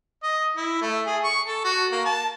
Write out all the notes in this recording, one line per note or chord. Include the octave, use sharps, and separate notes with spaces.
D#5
E4
A3
G#4
C#6
A4
F#4
A#3
A5